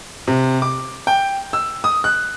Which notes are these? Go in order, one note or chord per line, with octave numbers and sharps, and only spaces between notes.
C3
D6
G5
E6
D#6
F#6